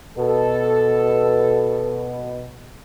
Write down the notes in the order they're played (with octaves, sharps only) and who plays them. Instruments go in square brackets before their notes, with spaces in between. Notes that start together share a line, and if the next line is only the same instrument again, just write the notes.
[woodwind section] B2 [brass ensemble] A4